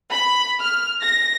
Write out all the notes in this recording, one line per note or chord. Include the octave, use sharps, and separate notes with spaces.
B5
F6
A#6